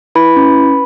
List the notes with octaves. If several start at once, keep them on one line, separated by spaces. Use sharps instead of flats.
E4 B4 B5
C#4